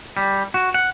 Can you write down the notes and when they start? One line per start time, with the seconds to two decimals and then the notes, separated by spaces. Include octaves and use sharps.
0.17 G3
0.54 F#4
0.74 F#5